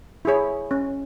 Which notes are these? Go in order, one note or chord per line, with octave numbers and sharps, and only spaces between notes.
E4 G#4 C#5
C#4